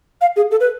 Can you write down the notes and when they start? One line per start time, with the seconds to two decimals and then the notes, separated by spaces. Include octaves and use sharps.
0.21 F5
0.36 G#4
0.51 A4
0.60 B4